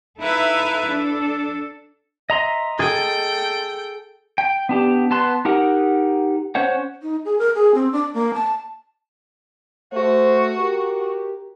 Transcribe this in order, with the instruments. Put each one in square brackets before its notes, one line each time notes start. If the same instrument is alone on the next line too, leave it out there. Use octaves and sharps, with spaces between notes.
[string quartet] D#4 E4 A4 B4 E5 F5
D4 A4
[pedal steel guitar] D#5 A#5 C6 [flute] E5
[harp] G#4 A6 [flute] A4 [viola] G5
[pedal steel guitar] G5
B3 D4 G4
B3 A5 C6 F#6
D#4 G4 A#4 F#5
C#4 C5 C#5 F#5
[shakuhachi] D#4
G#4
A#4
G#4
C4
D4
A#3
A5
[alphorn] A3 [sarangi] F#4 [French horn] C5
[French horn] G4 [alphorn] A#4